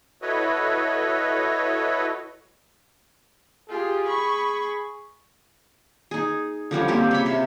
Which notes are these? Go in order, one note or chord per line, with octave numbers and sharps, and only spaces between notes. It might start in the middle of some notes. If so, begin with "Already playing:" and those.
E4 F#4 A4 B4 C#5 D#5
F4 G4 G#4
B5 C#6
D#4 G#4
D3 F3 G3 C#4
A#3 C4 G4
C#3 C#5 B5
C3